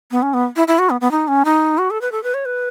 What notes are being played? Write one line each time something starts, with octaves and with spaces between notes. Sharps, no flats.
B3
C#4
B3
E4
E4
F#4
B3
B3
D#4
C#4
D#4
F#4
A4
B4
A4
B4
C#5
B4